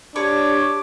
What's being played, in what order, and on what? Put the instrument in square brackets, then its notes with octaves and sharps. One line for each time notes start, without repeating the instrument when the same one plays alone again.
[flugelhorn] D4 [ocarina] G4 [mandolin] C#5 [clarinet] D6